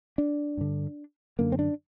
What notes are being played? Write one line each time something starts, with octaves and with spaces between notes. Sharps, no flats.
D4
G2 D3
F#2 D3 A#3
C4
D4